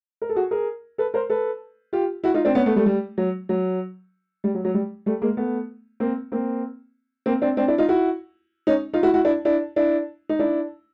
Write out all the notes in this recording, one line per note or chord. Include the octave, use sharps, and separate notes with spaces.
A#4
A4
F#4 G#4
G#4 A#4
A4 B4
A#4 C5
A4 B4
F4 G4
E4 F#4
D#4 F4
C4 D4
B3 C#4
A3 B3
G3 A3
G3
F#3
F#3
G3
F#3
F#3
G3
G3 A3
G#3 A#3
A3 B3
A#3 C4
A#3 C4
A#3 C4
C4 D4
C4 D4
D4 E4
D#4 F4
E4 F#4
C#4 D#4
D#4 F4
E4 F#4
E4 F#4
D4 E4
D4 E4
D4 E4
D#4
D4 E4